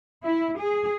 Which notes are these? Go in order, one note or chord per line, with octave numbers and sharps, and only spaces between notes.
E4
G#4